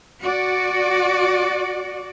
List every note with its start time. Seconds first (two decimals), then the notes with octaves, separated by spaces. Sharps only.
0.20 F#4 D5